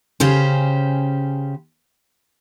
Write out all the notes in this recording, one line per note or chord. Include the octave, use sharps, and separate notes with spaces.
C#3 C#4 G4 C5